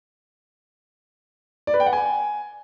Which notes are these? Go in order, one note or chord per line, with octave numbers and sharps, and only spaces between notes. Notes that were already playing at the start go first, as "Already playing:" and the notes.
D5
B4
G5
F#5
G#5